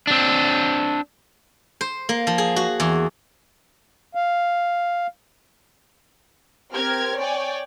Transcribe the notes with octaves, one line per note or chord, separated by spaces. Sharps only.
C4 D4
C5
A#3
F3
G#4
F#4
E2
F5
C4 G4 A#4 F6 G#6
C#5 D5 G5 G#5